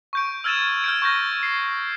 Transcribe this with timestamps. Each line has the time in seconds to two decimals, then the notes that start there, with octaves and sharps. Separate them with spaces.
0.13 C#6 G6 D7
0.44 E6 F6 G#6 A6 D#7 E7
0.84 F6 G6 D7
1.02 C#6 G6 A#6
1.43 C7